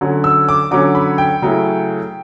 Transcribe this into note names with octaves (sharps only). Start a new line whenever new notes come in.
D3 F#3 C#4
E6
D6
D3 F#3 C#4 D6
B5
G5
C#3 F#3 A3 E4